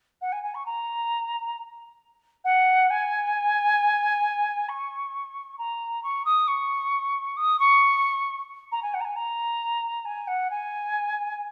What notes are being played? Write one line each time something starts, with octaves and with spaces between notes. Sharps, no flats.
F#5
G#5
G#5
C#6
A#5
F#5
G#5
C#6
A#5
C#6
D#6
C#6
D#6
C#6
A#5
G#5
F#5
A#5
G#5
A#5
G#5
F#5
G#5